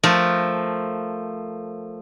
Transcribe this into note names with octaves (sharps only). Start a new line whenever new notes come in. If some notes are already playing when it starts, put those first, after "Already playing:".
F3 A3 A#4